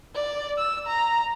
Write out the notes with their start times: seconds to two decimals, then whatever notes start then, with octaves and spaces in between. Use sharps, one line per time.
0.15 D5
0.58 E6
0.87 A#5